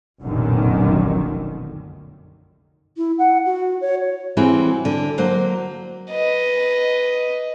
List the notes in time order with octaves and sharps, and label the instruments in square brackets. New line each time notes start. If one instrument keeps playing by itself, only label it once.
[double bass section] F1 B1 F#2 A#2 D3 D#3
[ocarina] E4
F#5
F#4
C#5
[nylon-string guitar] E3 G3 C4 E4 F#4 G#4
D3
F#3 A#3 C5 F5
[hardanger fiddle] B4 D#5